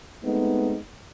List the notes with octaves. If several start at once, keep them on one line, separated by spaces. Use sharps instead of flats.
G#3 A3 B3 C4 D#4